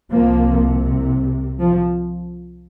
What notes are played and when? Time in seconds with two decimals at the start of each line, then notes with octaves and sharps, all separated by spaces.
0.11 C2 C3 F3 A#3
1.60 F3